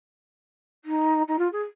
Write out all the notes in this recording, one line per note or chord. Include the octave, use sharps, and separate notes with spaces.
D#4
D#4
F4
G#4